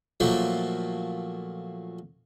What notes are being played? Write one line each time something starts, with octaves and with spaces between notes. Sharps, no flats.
A#2 F3 F#3 A3 A#3